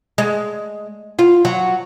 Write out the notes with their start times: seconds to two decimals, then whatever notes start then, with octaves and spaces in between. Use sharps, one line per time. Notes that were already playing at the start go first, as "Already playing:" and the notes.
0.18 G#3
1.19 F4
1.45 F#3